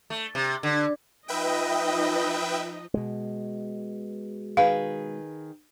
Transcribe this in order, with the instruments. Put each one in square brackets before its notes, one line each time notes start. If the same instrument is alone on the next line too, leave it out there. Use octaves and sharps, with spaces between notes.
[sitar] A3
C3
D3
[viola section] F3 D#4 D#5 [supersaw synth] B4 E5 G5
[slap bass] B2 G#3
[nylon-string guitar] D#3 G#4 B4 [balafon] F5